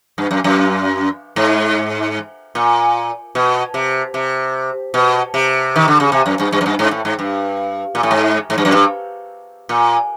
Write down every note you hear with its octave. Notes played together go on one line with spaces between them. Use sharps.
G2
F#2
F#2
G#2
A#2
B2
C3
C3
B2
C3
D#3
D3
C#3
C3
F#2
G2
G2
F#2
G2
G#2
A2
G#2
G2
A#2
A2
G#2
G#2
G2
F#2
G2
A#2